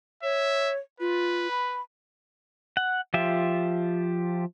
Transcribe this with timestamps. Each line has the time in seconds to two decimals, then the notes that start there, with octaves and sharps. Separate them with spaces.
0.23 C#5 E5
1.00 F4 B4
1.51 B5
2.77 F#5
3.14 F3 F4 G4 E5